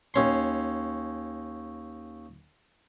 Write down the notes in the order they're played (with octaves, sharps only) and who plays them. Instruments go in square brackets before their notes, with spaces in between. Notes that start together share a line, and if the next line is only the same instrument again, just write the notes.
[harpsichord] D#2 C#4 C6